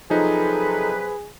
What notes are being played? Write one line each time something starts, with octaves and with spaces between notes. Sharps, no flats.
C3 F3 F#3 D#4 G#4 A4 B4